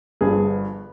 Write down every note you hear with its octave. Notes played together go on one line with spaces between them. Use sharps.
G1 G2 F3 G#4